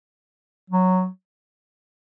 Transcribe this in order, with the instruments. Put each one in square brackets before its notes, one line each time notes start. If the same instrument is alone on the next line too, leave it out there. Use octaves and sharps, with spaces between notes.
[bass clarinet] F#3